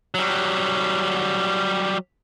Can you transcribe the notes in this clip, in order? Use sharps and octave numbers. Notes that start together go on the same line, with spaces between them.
F#3 G3